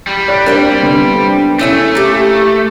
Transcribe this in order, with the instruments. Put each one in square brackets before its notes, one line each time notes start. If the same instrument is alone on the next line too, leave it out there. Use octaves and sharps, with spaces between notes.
[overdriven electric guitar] G3
[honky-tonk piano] D5 F#6 B6
[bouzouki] A#3 C4 E4 [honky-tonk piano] D4 G4 A#4
[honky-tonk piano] D3 B3
[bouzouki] C#3 E5 G#5 [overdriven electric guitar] A3 [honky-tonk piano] C#4 E4
[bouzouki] A#3 G4